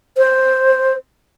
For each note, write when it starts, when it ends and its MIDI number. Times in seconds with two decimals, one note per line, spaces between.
0.17 0.94 72